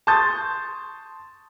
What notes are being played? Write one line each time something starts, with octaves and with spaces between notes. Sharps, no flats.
A5 C6 C#6 D#6 G6 A6